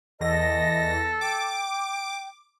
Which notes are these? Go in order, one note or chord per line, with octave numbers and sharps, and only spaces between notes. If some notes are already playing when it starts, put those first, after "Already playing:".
E2 A4 D#5 A#6
G5 D6